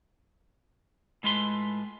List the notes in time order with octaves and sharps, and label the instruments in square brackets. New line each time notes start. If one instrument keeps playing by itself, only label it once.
[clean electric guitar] A2 G#3 F4 B4 C6